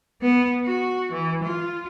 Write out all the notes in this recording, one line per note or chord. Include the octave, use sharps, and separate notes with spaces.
B3
F#4
E3
F4